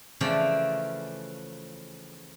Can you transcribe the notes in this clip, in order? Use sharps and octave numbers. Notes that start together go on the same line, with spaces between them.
C#3 E3 F3 A3 D5 A5